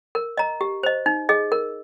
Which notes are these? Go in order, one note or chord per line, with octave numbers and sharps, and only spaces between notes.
A#4
D#5 A#5
G4
C5 D#5
D#4
G#4 D#5
A#4